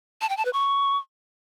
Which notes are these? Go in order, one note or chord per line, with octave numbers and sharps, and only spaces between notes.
A5
G5
A5
B4
C#6